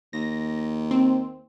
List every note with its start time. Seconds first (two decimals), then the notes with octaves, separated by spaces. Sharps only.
0.13 D#2 A#6
0.91 C4